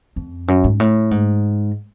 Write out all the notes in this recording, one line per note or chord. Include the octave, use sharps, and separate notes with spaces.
F2
F#2
G#2
A2
G#2